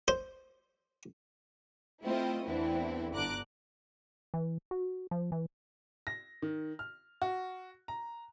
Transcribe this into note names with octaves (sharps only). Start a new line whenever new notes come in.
C5
A3 C4 E4 F4 C5 D#5
E2 D3 E3 C4 E4
G1 D3 A#5 D6 F#6
E3
F#4
F3
E3
A#6
D#3
F6
F#4
A#5